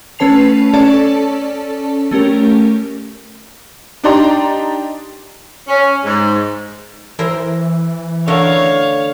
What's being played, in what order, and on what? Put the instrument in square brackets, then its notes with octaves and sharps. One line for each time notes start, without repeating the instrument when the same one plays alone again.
[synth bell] A3 C#4 B4 A5 C7 F7
C#4 A4 D5 A5
A3 C#4 G4 A#4
[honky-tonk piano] D4 D#4 G4 D5 A#5 C6
[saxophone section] C#4
G#2
[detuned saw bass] E3 [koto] E4 A#4 C5
[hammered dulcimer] D3 [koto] A3 F#4 A#4 [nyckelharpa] C#5 F5